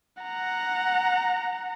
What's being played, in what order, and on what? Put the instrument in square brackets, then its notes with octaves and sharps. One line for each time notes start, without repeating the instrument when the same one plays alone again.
[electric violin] F#5 A#5